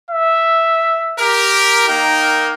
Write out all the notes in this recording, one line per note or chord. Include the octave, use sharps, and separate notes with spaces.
E5
G4 A#4
A#3 D#4 A#4 G5